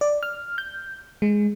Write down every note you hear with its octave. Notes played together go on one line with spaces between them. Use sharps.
D5
F6
G6
G#3